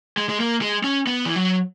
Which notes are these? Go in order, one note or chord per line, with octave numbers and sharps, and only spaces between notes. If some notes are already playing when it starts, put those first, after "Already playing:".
G#3
G#3
A#3
G#3
C#4
B3
E3
F#3